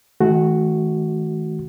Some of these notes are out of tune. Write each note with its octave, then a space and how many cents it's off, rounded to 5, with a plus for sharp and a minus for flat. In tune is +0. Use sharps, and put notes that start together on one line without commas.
D#3 +45 A3 -30 F#4 +0